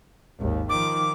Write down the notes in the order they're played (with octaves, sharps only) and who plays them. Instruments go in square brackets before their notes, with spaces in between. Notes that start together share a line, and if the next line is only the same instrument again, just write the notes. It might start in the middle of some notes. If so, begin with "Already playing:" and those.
[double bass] G#1 D#2
[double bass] D#3 F3 [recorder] D6